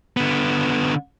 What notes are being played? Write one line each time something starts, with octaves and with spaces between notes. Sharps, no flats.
D3 B3